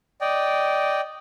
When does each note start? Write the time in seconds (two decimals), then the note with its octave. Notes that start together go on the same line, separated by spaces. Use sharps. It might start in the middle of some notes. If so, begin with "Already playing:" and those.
0.21 D5 D#5 G5